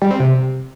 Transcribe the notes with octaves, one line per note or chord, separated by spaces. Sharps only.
G3
C4
C3